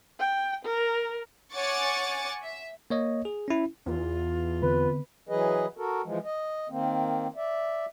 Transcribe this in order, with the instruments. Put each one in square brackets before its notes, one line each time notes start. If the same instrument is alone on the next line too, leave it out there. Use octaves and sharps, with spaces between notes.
[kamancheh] G5
A#4
[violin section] C#5 F#5 G#5 C#6 D6 A6
E5
[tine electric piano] A#3 C#5 D#5
G#4
C#4 E4
[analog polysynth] E2 [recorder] F4
[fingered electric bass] D3 B3 C4 [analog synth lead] B4
[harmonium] E3 F#3 G#4 B4 D#5
F#4 A4 A#4
E3 F3 G#3
D#5
D#3 A#3 C4
D5 E5